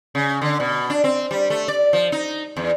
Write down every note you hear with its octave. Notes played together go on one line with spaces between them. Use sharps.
C#3
D3
B2
D4
C4
G3
A3
D5
F3
D#4
E2